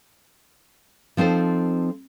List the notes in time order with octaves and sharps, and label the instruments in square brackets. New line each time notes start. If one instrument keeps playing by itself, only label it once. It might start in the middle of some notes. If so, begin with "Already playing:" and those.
[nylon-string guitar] F3 C4 D#4 A4 C5